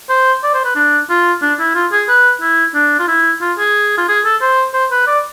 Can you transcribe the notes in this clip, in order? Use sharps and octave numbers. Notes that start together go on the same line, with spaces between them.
C5
D5
C5
B4
D4
F4
D4
E4
F4
G#4
B4
E4
D4
F4
E4
F4
G#4
F4
G#4
A4
C5
C5
B4
D5